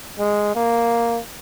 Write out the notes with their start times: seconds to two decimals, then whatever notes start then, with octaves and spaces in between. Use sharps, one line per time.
0.19 G#3
0.55 A#3